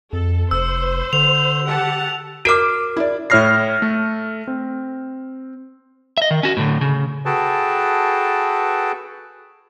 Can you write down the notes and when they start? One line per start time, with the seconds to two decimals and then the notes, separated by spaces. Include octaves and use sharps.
0.13 F2 A4
0.51 F1 C5 E6
1.13 D3 F7
1.67 G4 F#5 A5
2.45 F#4 A#4 D6 F6 D7
2.97 E4 D5
3.30 A2 E4 C#5 F6 A#6 C7
3.82 A3 A4
4.47 C4
6.18 D#5 E5
6.31 D#3
6.43 C#4 F#4
6.57 A2 D3
6.81 C#3
7.25 F#4 G#4 A4 B4 G5 A5